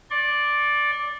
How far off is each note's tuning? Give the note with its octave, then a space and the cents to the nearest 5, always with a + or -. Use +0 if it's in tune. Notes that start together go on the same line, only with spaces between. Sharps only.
D5 +0 C6 +45